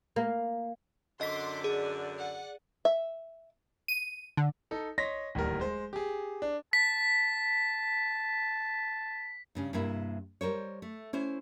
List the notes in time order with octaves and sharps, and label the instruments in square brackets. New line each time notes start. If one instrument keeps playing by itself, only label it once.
[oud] A#3
[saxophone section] F#2 D3 [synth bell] D#5 B6 [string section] C6 D6
[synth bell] G#4 [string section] D5
[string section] D5 F#5
[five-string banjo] E5
[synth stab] D#7
D3
[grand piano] D#4 A4
C#5 D#5 C6 A#6 B6
D1 D#2 G3 A#4
G#3 C5
G4 G#4
D4
[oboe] A5 [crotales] B6
[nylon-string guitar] G2 C#3 C#4
G2 C3 A#3 E4
G3 A#4 C5 C#5
A3
C#4 E4 C5